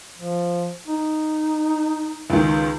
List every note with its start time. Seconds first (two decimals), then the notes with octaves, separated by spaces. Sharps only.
0.18 F3
0.88 D#4
2.30 C#2 D#3